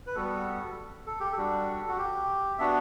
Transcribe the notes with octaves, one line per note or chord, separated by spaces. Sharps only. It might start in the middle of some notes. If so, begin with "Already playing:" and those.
B4
G3 B3 F#4 A4
A4
G4
A4
G3 D4 F#4
F#4
G4
B3 D4 F#4 E5